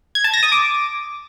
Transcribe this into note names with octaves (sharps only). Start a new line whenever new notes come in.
G#6
A5
A#6
D#6
D6